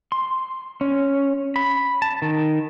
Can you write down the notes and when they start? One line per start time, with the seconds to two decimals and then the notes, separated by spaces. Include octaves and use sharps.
0.12 C6
0.81 C#4
1.56 B5
2.02 A5
2.22 D#3